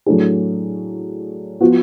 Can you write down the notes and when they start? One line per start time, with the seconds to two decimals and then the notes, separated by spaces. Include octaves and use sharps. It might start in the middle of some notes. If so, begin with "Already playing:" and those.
0.06 A2 F#3 A3 D4 G#4
1.60 F3 B3 F#4